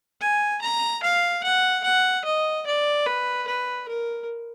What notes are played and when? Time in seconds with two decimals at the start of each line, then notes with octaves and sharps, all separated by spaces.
0.21 G#5
0.61 A#5
1.03 F5
1.43 F#5
1.84 F#5
2.25 D#5
2.66 D5
3.06 B4
3.47 B4
3.88 A#4